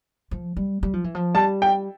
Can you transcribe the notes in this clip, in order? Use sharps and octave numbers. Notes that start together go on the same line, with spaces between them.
F3
G3
G3
F3
E3
F3
G3 A5
G5